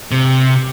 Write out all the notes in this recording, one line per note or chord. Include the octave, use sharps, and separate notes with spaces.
C3